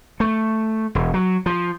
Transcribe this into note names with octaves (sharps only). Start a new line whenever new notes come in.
A3
E1
F#3
F3